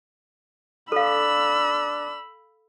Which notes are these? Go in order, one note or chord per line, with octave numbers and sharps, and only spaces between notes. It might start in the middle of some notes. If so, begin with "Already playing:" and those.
D4 A4 F5 B5 E6